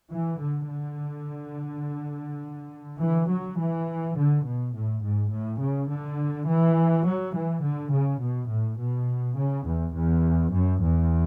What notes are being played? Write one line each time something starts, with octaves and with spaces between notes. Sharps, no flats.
E3
D3
D3
E3
F#3
E3
D3
B2
A2
G#2
A2
C#3
D3
E3
F#3
E3
D3
C#3
B2
A2
B2
C#3
E2
E2
F#2
E2